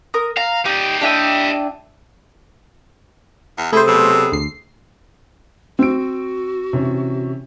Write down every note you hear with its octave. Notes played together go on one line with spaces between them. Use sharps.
A#4 D#6
F5 A#5
D#4 G4 D5
D4 E4 G4 D#5 G5
E2
C3 A3 E4 G#4 A4 C5
B2 F#3 B5 E6
D2 C7
C4 F#4 E6 D7
C3 E3 C#4